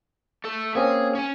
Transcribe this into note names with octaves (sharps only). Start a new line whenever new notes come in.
A3 A4
A#3 C4 C#4 G#4
C#4 G#5